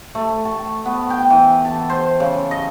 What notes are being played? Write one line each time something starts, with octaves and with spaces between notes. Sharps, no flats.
A3
A5
B3
G5
E3
A5
C5
C#3
D#5